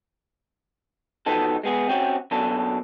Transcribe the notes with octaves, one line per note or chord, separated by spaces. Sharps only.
B2 F3 B3 D#4 A4
G#3 B3 G#4
C4 C#4 F#4 G4
B2 F#3 A#3 C#4 D4 A4